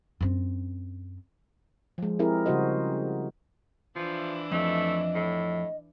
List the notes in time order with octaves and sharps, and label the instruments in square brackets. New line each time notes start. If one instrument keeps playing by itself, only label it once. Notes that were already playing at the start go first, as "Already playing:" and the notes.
[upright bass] F#2 C4
[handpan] F3 G#3
C4 E4 G4 G#4 A#4
C#3 G3 F#4 C5 D#5
[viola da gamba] E3 D4 E4 [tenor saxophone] F3
[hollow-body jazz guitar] F2 [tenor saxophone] A3 [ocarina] D#5
[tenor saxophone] A2